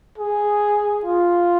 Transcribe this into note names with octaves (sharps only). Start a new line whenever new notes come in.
G#4
F4